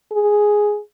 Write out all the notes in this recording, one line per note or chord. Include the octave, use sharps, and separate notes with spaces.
G#4